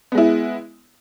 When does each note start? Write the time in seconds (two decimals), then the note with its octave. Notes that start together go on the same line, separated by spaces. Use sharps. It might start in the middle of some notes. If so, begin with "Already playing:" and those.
0.12 B3
0.15 G#3
0.18 E4